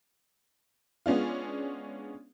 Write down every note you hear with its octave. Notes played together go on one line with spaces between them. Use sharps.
G#3 B3 C#4 D4 F4